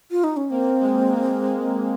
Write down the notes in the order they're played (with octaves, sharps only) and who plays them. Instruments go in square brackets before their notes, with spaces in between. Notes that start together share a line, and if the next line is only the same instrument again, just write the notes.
[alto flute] F4
D#4
C#4
[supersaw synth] A#3 [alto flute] C4
[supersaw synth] G#3
A#3
G#3